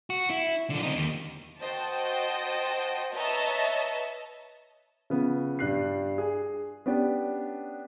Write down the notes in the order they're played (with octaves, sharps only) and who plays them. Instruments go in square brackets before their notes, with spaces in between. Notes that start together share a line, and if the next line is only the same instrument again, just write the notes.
[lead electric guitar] F#4
E4
D3 F3
C4 D#4
D#2
[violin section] F#4 C5 D#5 G5 A5
B4 C#5 D#5 E5 A5 A#5
[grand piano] C#3 F3 B3
G2 F#6 C7
G#4 G#5
B3 C#4 D4 G4